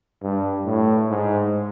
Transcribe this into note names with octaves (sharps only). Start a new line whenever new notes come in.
G2
A2
G#2